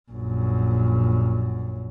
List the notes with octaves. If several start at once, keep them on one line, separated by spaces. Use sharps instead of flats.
A#1 F#2